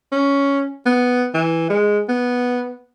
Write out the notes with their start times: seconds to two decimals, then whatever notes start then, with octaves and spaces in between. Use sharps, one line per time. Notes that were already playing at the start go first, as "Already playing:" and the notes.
0.12 C#4
0.86 B3
1.34 E3
1.70 G#3
2.09 B3